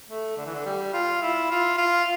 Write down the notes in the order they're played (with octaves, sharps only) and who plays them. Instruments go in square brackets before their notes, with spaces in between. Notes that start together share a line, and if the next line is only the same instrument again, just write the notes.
[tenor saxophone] A3
D3
E3
D3
G3
F4
E4
F4
F4